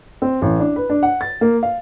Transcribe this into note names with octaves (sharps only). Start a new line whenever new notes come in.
C4
A1
D4
B4
D4
F#5
A6
A#3
F5